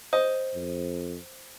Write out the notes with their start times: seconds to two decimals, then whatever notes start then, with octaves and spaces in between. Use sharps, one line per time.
0.13 C5 D#5
0.54 F2